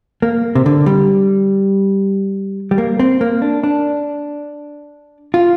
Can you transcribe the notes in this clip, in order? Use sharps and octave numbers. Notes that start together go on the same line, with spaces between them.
A#3
C3
D3
G3
G3
A#3
C4
A#3
D4
D4
F4